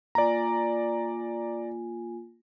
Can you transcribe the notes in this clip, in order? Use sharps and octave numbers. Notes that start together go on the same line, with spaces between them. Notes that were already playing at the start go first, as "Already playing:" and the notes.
A#3 F4 D5 G#5 A#5